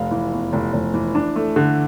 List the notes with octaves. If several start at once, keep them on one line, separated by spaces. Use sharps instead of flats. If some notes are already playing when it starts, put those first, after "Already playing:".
Already playing: F1 F5
E3
E2
F1
F1
E3
D4
A3
D3